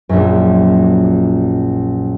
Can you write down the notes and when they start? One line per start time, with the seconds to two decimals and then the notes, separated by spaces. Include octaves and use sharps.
0.09 A#1 F#2